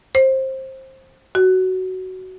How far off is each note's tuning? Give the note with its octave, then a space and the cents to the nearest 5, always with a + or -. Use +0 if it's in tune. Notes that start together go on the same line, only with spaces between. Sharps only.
C5 +20
F#4 +10